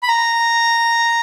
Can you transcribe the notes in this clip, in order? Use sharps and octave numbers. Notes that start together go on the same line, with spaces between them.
B5
A#5